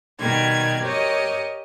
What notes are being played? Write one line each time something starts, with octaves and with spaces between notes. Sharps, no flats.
B2 D#3 G3 G#6
G4 A#4 C#5 D#5